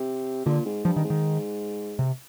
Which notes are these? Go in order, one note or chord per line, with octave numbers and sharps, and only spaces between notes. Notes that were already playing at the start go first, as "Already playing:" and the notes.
Already playing: C3
A#2 D3
G#2
G2 F3
D#3
G#2
D#3
C3